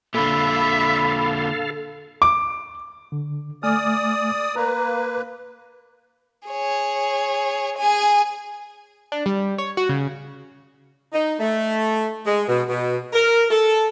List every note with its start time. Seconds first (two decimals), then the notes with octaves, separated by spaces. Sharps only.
0.14 A#2 D3 A4 E5 F5 B5
2.22 D6
3.12 D3
3.63 A3 D5 G#5 D#6 F6
4.56 A#3 B4 A#5
6.49 G#4 C#5
7.77 G#4 G#5
9.12 D4
9.26 G3
9.58 C#5
9.77 F#4
9.89 C#3
11.13 D#4
11.40 A3
12.26 G#3
12.48 B2
12.69 B2
13.13 A#4
13.50 A4